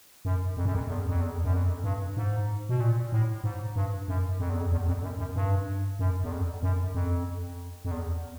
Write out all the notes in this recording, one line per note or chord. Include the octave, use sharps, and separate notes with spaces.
F#2
F2
F#2
F2
E2
F2
E2
F#2
F2
G2
G#2
B2
A#2
A2
G#2
G2
F#2
F2
E2
F2
E2
F2
F#2
F#2
G2
F#2
E2
F2
F#2
F2
F2
E2